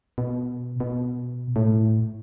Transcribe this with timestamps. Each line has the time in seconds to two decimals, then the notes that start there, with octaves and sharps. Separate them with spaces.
0.18 B2
0.80 B2
1.56 A2